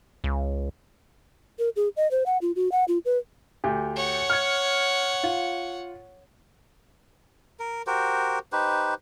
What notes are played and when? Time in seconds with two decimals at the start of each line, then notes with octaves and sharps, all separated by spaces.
0.24 C#2
1.59 A#4
1.76 G#4
1.97 D#5
2.11 C5
2.26 F#5
2.42 F4
2.56 F#4
2.72 F#5
2.88 F4
3.05 B4
3.64 D2 G4
3.97 C#5 F#5
4.30 F6 G#6
5.23 F4
7.60 A#4
7.87 F#4 G4 A#4 C5
8.52 D#4 G4 B4 C5